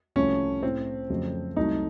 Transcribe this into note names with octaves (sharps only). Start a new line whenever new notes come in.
C2 C3 F3 A3 C#4
A2 A3 C4
F2 C#3 F#3 A3
C2 C3 F#3 A3 D#4